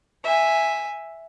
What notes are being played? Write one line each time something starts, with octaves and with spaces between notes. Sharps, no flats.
E5 G#5